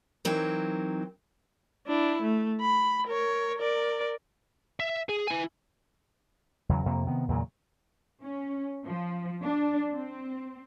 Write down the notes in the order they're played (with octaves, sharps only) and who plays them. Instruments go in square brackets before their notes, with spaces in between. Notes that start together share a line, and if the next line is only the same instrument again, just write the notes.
[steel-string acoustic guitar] E3 F#3 C4 D#4 A#4
[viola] D4 E4
A3
B5
A#4 C#5
A#4 D5
[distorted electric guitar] E5
G#4
E4 G#5
[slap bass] E2 C#3 F#3
F2 C3 A#3
C3 D#3 B3
E2 A#2 C#3 F#3
[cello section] C#4
F3
D4
C4